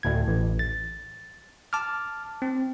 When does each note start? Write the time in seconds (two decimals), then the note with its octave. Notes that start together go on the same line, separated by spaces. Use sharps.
0.03 D2 A2 G#6
0.28 A1
0.59 A6
1.73 A5 D6 F6
2.42 C4